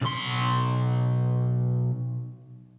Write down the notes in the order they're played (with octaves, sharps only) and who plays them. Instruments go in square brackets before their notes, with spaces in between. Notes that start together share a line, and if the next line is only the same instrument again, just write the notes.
[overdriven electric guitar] B1 C6